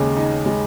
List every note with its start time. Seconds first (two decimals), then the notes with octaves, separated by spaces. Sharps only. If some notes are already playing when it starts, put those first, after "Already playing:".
Already playing: D#2 C#3 G#3
0.17 D#4
0.46 G#3